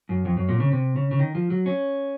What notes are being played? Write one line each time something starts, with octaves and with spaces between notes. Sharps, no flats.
F#2
F2
F#2
A#2
C#3
C3
C#3
C#3
D#3
F3
F#3
C#4